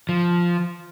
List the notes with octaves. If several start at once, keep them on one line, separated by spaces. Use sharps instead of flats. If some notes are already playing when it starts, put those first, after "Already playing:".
F3